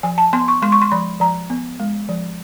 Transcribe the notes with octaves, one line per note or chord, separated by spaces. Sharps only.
F3 G#5
A5
B3 C6
C#6
G#3 C6
C#6
C6
F3 B5
F3 A#5
B3
G#3
F3